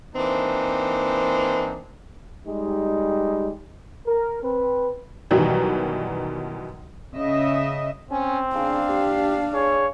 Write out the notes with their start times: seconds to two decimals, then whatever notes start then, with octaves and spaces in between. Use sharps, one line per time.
0.15 E3 A#3 C4 D4 D#4
2.47 G3 G#3 D#4 G4
4.06 A#4
4.43 C4 B4
5.31 F#2 B2 D#3 E3 F#3 G3
7.15 C#3 D#5 E5
8.11 C4 C#4
8.55 C#3 D4 F5
8.89 G4
9.53 G#4 C#5